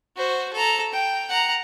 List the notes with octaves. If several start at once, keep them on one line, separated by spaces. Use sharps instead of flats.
F#4 C5
A4 A#5
G5
F#5 A#5